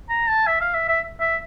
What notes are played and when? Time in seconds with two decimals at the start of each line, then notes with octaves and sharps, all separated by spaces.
0.10 A#5
0.28 A5
0.47 E5
0.61 F5
0.74 E5
0.88 E5
1.21 E5